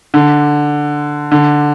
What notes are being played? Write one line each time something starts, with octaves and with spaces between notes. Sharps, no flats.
D3
D3